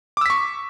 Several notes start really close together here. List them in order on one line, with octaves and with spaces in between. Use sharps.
D6 E6 B6 C#6